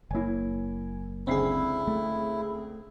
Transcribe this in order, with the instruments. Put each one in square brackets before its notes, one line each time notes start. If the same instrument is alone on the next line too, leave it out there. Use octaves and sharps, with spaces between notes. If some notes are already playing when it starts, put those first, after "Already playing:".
[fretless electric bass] F#1 A#3 [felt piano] E4 C#5 G#5
[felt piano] C#2 D3 C7 [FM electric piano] C4 G#4 [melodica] E4
[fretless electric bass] A3